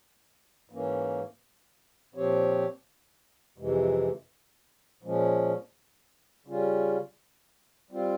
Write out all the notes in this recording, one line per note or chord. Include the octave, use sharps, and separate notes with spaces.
G#2 E3 A#3 C#4
A#2 F3 C4 G4 C#5
F2 C3 E3 G#3
A#2 F3 G#3 C#4
C#3 G3 C#4 F4
G3 C4 F4